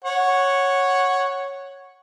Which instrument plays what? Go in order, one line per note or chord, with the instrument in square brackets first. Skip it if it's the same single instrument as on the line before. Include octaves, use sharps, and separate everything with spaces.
[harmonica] C#5 F#5